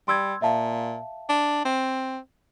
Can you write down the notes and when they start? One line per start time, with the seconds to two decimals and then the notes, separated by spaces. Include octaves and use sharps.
0.08 G3 C6 E6 G#6
0.42 A#2 E5 F5 A5
1.29 D4
1.65 C4